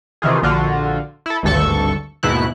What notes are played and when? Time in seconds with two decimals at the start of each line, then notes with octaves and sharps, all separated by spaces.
0.22 C3 D#3 E3 F4 G#4
0.43 A#1 D3 F4 F#4
1.26 E4 A4
1.43 G#1 D2 G2 A4 C#6
2.23 D#2 G#2 B2 E4 F#6